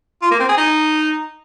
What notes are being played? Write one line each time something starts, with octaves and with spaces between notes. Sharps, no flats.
F4
A#3
C4
G#4
D#4